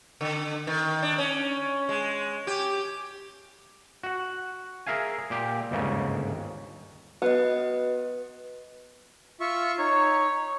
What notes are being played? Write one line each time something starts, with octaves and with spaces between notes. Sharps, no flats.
D3
D#3
D4
C#4
G#3
G4
F#4 F#5
G#4 A#4 E5 F5 G#5
A#2 G4
G1 D#2 G#2 C#3
B3 F#4 B4 D#5
F4 E5 C#6
D#4 C#5